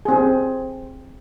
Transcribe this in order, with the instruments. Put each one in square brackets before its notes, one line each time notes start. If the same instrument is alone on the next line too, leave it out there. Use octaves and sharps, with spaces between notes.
[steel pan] C4 G#4